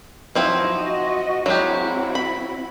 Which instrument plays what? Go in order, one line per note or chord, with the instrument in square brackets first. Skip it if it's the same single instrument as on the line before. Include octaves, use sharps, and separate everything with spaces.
[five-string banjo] F3 C4 E4 [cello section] F#3 D#4 F#4
[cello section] F#4 D#5
[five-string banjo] F#3 G#3 G4 [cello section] C4 E4 F#4
[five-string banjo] B5